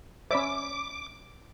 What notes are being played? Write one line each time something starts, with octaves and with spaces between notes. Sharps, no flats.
C#4 C5 D5 E5 B5 D6